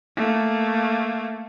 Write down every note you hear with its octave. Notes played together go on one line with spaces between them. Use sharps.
A3 A#3